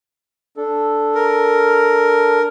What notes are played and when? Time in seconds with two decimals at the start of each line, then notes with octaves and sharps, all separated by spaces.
0.57 D4 A4
1.15 A#4